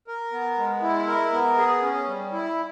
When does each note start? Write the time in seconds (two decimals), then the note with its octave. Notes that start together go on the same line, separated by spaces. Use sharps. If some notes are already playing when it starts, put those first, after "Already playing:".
0.08 A#4
0.32 B3
0.58 G#3
0.82 E4
1.07 A#4
1.32 B3
1.58 G#4
1.83 C#4
2.08 G3
2.32 E4